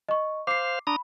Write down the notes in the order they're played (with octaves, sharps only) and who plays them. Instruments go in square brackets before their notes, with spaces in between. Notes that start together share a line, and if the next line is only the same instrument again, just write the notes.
[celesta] D#5 C#6
[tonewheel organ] C5 F5 [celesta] D6 C7
[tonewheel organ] D4 A#5 D#6 [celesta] B5